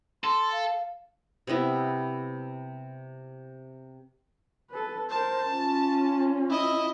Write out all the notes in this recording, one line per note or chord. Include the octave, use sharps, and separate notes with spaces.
A4 C6
F5
C3 G3 B3 E4
A4 B4
A#4 C5 A5
C#4 F4
E4 D#5